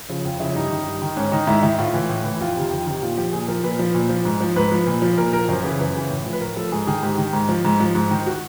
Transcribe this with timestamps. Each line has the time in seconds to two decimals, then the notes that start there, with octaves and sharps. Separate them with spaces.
0.09 C#3 F3
0.25 F2 F4
0.40 C#3 F3 E4
0.55 G2 D#4
0.71 D#3
0.86 G2
1.02 D#3
1.17 G#2 C#4
1.32 D#3 D#4
1.47 G#2 E4
1.63 D#3 E4
1.78 A2 F4
1.94 E3
2.09 A2
2.25 E3
2.41 F2 F4
2.56 C3 D#3
2.71 F2
2.86 C3 D#3
3.01 A#2 F4
3.17 F3 G4
3.33 A#2 G#4
3.48 F3 A#4
3.63 A#2 B4
3.79 F3
3.94 A#2
4.09 F3
4.25 G#2
4.41 F3
4.56 G#2 B4
4.72 F3
4.86 A#2
5.02 F3
5.17 A#2 A#4
5.33 F3 A#4
5.49 F#2 C5
5.63 C#3 E3 B4
5.79 F#2 B4
5.95 C#3 E3
6.10 A2
6.26 F3
6.33 B4
6.41 A2 A#4
6.56 F3 A4
6.72 G#2 G#4
6.87 D#3 G#4
7.03 G#2 G4
7.18 D#3
7.33 G#2
7.49 F3
7.65 G#2
7.80 F3
7.95 G#2
8.11 D#3
8.26 F#4